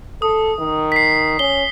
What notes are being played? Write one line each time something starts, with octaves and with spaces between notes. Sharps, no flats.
A4 D#6
D#3
B6 C7
C#4 G7